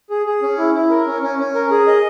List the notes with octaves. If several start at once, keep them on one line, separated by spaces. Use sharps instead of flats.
G#4
G#4
C#4
E4
E4
A#4
C#4
C#4
C#4
A#4
G#4
D#5